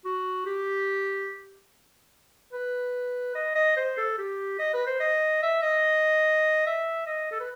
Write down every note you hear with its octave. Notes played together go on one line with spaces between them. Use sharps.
F#4
G4
B4
D#5
D#5
C5
A4
G4
D#5
B4
C5
D#5
E5
D#5
E5
D#5
A4
B4